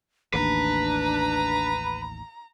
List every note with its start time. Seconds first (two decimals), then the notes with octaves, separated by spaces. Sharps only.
0.34 A1 D#2 D4 B4 A#5